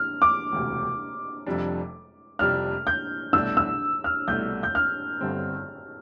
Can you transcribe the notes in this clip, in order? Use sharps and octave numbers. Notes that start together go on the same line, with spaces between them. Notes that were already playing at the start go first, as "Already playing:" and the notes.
Already playing: F6
D6
E1 D2 C3
F1 F2 C3 G3 D4
F1 F2 C3 G3 D4 F6
G6
C2 B2 A3 D4 E6
E6
F6
C2 B2 A3 D4 G6
G6
F6
G1 G2 D3 G3 C4